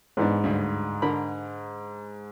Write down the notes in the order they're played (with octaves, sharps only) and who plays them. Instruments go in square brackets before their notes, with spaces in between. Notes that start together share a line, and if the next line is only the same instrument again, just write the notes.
[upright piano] G#2 [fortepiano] E3 B3 D4
[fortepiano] D2 G2
D3 A#4 B5